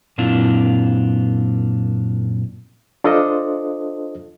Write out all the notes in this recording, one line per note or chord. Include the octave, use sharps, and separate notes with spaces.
F#2 A#2 C4 D4 E4 F4
D4 F4 A4 C5 D#5